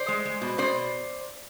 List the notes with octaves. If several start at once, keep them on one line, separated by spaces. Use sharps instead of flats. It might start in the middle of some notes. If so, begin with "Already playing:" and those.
Already playing: C5 D5
G#3
G#3
B2
B2 C5 D5